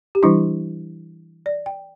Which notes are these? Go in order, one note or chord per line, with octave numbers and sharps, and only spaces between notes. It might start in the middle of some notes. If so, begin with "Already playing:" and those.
G4
E3 G3 D4 E4
D5
G5